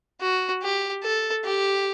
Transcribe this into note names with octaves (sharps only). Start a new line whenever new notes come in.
F#4
G4
A4
G4